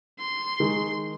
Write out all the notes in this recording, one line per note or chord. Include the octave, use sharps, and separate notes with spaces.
C6
D#3 G#3